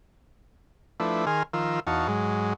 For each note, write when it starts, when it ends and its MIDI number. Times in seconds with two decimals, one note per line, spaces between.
1.00 1.25 53
1.00 1.25 57
1.00 1.25 62
1.00 1.25 64
1.00 1.25 71
1.27 1.43 51
1.27 1.43 68
1.27 1.43 70
1.27 1.43 80
1.27 1.43 84
1.27 1.43 89
1.54 1.80 51
1.54 1.80 53
1.54 1.80 65
1.54 1.80 70
1.54 1.80 88
1.87 2.07 40
1.87 2.07 63
1.87 2.07 66
1.87 2.07 77
1.87 2.07 81
1.87 2.07 85
2.08 2.53 44
2.08 2.53 54
2.08 2.53 56